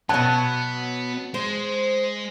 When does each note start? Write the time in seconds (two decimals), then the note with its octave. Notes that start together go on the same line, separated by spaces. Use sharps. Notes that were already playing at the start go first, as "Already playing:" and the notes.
0.09 B2 F#3 B3 A5
1.34 G#3 C5